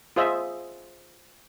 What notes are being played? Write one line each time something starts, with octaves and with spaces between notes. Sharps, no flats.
F4 G#4 C5 D#5 E5